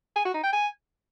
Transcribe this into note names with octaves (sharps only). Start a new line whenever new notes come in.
G#5
F#4
D#4
G5
G#5